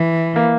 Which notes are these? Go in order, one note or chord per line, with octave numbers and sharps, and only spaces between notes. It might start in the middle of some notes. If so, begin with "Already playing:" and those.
Already playing: E3
A#3